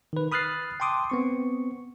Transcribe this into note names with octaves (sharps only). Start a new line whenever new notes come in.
D#3 B4
B5 D#6 F6 F#6 A6 C7
G5 A5 C6 D6 D#6
B3 C4 C#6